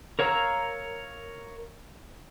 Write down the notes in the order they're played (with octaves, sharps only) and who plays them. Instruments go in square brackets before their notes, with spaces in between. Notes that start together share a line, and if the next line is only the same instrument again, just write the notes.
[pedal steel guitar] A#4 C#5 F5 A#5 E6